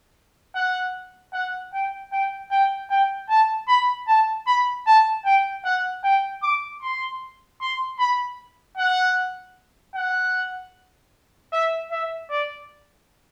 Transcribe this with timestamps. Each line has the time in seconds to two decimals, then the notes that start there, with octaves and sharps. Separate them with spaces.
0.55 F#5
1.33 F#5
1.73 G5
2.12 G5
2.51 G5
2.90 G5
3.29 A5
3.68 B5
4.08 A5
4.47 B5
4.86 A5
5.25 G5
5.65 F#5
6.04 G5
6.43 D6
6.82 C6
7.61 C6
7.99 B5
8.77 F#5
9.95 F#5
11.52 E5
11.91 E5
12.31 D5